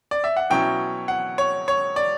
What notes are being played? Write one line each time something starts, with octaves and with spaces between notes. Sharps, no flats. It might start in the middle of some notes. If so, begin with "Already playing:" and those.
D5
E5
F#5
B2 F#3 C#4 E4 G5
F#5
C#5
C#5
D5